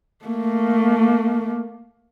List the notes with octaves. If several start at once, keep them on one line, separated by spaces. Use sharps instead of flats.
A3 A#3